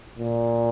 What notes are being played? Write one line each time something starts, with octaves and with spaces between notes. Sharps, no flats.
A#2